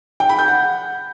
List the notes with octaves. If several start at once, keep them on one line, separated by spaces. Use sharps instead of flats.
G5
B5
G6
F#5